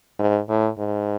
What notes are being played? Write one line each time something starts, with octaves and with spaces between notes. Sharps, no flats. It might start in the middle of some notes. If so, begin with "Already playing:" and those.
G#2
A2
G#2